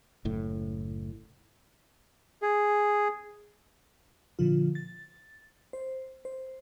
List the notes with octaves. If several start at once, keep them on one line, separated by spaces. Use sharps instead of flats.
F#1 A2
G#4
A#2 D3 F3 F4
A6
C5
C5